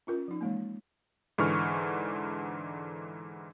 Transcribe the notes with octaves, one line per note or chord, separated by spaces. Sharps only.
C#4 F4 A#4
F3 D#4
E3 G#3 A#3
G#2 D3 E3 C#6 F6